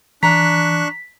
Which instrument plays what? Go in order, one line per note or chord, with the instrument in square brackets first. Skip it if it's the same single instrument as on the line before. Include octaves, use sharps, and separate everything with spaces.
[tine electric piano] E3 [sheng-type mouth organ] D4 C#6 F#6 [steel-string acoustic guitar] A#5 [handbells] B6